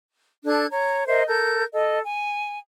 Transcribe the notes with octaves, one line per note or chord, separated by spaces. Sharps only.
D4 A4 F#6 G#6
C#5 A#5
A#4 C5 D#5 E5
A4 A#4 G6
A4 D#5
G#5